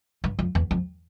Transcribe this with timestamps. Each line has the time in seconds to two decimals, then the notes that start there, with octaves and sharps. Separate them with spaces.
0.24 G2
0.39 F2
0.55 E2
0.71 F2